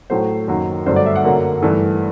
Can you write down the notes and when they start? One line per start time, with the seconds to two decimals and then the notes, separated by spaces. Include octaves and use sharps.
0.10 A2 F#3 A3 C5
0.48 F#2 D#3 F#3 A#3
0.86 G2 D3 F#3 A3 C5
0.96 D5
1.06 E5
1.16 F#5
1.25 F#2 D3 F#3 A#3
1.62 G2 E3 A3